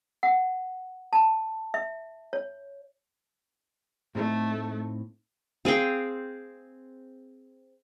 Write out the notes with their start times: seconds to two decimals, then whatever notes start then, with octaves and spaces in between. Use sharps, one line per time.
0.23 F#5
1.13 A5
1.74 E5
2.33 C#5
4.15 A2 A3 C4 D#4
5.65 C4 G#4 F5 G5